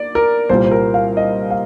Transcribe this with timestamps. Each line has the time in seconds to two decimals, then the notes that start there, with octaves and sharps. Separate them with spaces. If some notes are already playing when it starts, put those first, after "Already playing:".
Already playing: A#3 D5
0.15 A#4
0.49 C2 A#2 G3 A#3 C5
0.66 C5
0.71 A#4
0.94 F5
1.17 D#5
1.50 F5